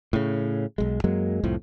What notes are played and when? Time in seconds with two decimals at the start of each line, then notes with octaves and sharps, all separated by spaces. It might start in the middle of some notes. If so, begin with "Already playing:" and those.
0.13 A2 C#3
0.78 B1 G#3
1.04 F#2 F#3 G#3 A#3
1.43 C2 F2 A2 F3